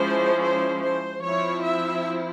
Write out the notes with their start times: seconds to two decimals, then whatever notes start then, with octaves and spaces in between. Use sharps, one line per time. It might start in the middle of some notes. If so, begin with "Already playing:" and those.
Already playing: F3 G#3 C#4 E4 C5
0.42 C5
0.82 C5
1.22 F3 C4 E4 C#5
1.63 E5